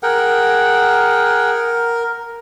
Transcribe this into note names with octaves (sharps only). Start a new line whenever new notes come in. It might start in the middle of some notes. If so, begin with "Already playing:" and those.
G#4 A#4 F#5 G5